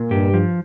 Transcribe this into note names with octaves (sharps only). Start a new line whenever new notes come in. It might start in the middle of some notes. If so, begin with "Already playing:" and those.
Already playing: A#2
G2 G4
F3